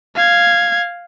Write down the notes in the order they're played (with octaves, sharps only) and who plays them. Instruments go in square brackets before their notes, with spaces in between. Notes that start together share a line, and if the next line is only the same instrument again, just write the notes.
[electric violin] F5 G#6